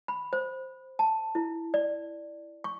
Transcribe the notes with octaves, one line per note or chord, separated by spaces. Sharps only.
B5
C5
A5
E4
D5
C#6